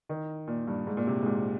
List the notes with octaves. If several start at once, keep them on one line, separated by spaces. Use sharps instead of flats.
D#3
A#2
G2
G#2
A#2
C3
G#2
A#2